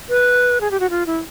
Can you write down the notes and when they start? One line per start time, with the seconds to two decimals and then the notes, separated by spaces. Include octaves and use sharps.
0.09 B4
0.61 G#4
0.71 G4
0.80 F#4
0.90 F4
1.06 E4